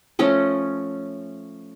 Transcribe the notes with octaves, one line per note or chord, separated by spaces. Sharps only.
F3 A3 C#4 D#5